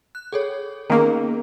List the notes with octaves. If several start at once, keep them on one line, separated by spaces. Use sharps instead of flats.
F#6
G#4 A4 C#5
D#3 A#3 B3 C#4 G#4